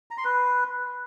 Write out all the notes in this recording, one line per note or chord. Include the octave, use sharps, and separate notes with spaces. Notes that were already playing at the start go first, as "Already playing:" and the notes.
A#5
C6
B4